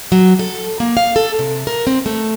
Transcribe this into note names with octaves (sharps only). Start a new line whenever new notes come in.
F#3
A4
A#3
F5
A4
C3
A#4
C4
A3